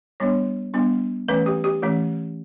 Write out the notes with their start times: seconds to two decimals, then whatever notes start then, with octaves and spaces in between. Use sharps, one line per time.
0.20 G3 B3 D4 C#5
0.74 G3 B3 D4
1.28 E3 A3 C#4 B4
1.46 G4
1.64 G4
1.82 E3 A3 C#4